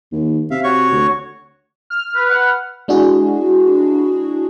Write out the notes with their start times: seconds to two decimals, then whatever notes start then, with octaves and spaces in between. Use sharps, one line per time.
0.12 D#2
0.51 C3 E5 F5
0.64 F#4 C#5 C#6
0.91 D2
1.90 F6
2.16 B4
2.30 B4 F#5
2.88 G#3 D4 E4 F#4 G#4